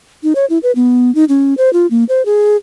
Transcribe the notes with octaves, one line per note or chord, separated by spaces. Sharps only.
D#4
C#5
E4
B4
B3
D#4
C#4
C5
F4
A#3
C5
G#4